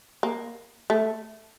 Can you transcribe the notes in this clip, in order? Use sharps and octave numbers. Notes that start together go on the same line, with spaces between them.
A#3
A3